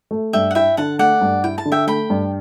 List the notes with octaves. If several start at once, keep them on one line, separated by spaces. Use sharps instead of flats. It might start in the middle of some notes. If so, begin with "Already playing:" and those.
A3
G2 E5 G5
F#5
E4 E5 G5
D3 F#5 A5
A3 D5 F#5
G2
E4 G5
A5
D3
E5 G5
A3 G5 B5
G2